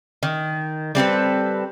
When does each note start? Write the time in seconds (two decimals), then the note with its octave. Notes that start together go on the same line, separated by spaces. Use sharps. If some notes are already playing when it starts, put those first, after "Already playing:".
0.23 D#3
0.95 G3 C4 A4 B4